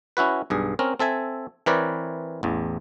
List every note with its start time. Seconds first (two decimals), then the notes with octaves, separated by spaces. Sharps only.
0.17 C#4 E4 F#4 B4
0.50 B1 G2 G#4
0.79 C4 C#4 A#4
1.00 C4 A4 E5 G#5
1.66 E3 C4 A#4 B4 C#5 D5
2.43 A1 E2